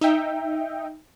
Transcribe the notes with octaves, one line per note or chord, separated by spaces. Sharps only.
D#4 E5 G5